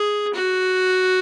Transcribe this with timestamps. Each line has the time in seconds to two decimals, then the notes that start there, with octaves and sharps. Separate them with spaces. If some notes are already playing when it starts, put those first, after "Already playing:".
Already playing: G#4
0.34 F#4